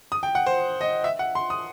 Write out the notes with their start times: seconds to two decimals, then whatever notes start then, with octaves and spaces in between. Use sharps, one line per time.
0.12 D#6
0.23 G5
0.35 F#5
0.46 C5
0.81 D#5
1.04 E5
1.19 F#5
1.35 C6
1.50 D#6